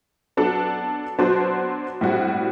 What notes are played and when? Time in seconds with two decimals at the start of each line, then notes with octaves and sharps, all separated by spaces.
0.37 F#3 B3 D4 A4
1.18 F#3 B3 D4 F#4 C5
2.01 A2 G3 C4 F#4